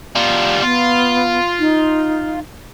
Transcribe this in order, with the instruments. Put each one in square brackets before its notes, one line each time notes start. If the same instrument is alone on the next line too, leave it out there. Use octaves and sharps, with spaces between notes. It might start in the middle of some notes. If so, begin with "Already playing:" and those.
[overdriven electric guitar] G3 F4
[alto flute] B3 [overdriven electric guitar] F4
[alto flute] D#4